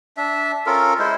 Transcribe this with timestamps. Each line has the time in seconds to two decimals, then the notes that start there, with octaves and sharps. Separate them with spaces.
0.17 D4 E5
0.66 C#4 F4 A4 A#4
0.99 G#3 E4 C5